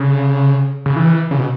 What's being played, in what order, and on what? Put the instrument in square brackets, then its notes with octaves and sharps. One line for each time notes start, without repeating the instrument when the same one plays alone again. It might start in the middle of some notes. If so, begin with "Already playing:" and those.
Already playing: [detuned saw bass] C#3
C#3
E3
C#3
B2